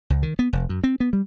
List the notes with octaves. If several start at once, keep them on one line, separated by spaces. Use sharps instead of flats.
C#2
D#3
B3
F1
F#2
C4
B3
G3